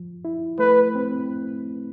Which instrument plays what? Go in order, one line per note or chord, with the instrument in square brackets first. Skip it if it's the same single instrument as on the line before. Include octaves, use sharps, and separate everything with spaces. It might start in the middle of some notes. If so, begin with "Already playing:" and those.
Already playing: [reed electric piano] F3
E4
[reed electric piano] A3 [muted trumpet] B4
[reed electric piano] C4